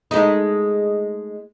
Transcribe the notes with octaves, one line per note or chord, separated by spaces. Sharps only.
G#3 A3 D#4